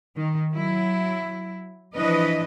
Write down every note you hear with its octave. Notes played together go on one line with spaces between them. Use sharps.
D#3
F#3 E4
E3 F3 D4 B4 D#5